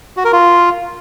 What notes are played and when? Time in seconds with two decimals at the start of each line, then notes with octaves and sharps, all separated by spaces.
0.17 F#4
0.25 A#4
0.32 F4